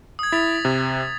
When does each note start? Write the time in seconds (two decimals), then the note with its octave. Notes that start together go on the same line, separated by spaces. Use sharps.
0.19 D#6 G#6
0.32 E4 A6 B6 F7
0.65 C3